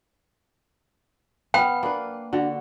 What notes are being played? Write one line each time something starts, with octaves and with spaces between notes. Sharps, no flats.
B3 F5 G5
A#3 D4 B4
D3 F#4